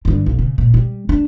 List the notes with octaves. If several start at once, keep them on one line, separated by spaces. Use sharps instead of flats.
G2 D3
B1
C#3
A#2
G3
D4